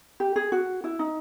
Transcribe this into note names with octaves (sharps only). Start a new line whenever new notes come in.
G4
G#4
F#4
E4
D#4